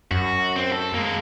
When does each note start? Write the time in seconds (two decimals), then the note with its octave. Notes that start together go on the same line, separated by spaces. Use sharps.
0.11 F#2 F#4
0.56 C4
0.72 A4
0.94 G#3 A#3